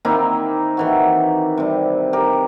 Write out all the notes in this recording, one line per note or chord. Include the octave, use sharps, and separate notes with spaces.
D#3 A#3 C4 E4
D#3 E3 F#4
C3 G3
G4 A#4